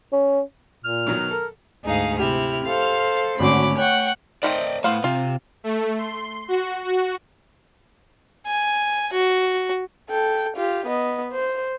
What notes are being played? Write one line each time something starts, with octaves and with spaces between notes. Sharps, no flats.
C#4
A#2 F6
B2 D#3 F#3
A4 A#4
D2 G#2 D#4 G#4 F5
C3 E4 G4 F6
A4 C5 F5
G#1 D3 A3 C#4 F#4 B5 D6
C#5 F#5 G5 C#6 F#6
D#3 A3 C4 D5 D#5
A2 B3 C5 F5
C3 F4
A3
C6
F#4
F#4
G#5
F#4
A4 G5
F4 G4
B3 D#5
C5